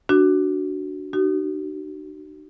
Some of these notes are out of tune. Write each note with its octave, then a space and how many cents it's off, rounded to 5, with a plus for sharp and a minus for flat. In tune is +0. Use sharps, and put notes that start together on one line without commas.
D4 +5 F#4 +5
D#4 -40 F#4 +40